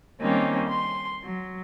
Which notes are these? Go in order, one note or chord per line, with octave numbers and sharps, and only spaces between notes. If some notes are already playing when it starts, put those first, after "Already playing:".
D#3 G3 A#3 C4 C#4 D#4
C6
F#3